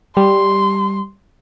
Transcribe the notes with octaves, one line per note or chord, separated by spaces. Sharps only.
G3 C6